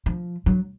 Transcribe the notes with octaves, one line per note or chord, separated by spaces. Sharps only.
F3
F#3